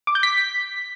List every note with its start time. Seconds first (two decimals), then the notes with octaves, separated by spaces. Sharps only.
0.07 D6
0.15 G6
0.23 B6